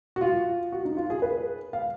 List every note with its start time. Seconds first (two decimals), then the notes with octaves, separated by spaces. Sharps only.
0.16 F#4
0.21 F4
0.72 F#4
0.85 D#4
0.97 F4
1.10 G#4
1.22 B4
1.73 F5